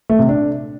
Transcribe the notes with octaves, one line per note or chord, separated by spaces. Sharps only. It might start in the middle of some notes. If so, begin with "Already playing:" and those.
A3
C3
D4